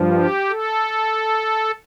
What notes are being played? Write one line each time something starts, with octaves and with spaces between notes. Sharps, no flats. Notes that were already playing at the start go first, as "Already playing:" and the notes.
Already playing: G2 F3
G4
A4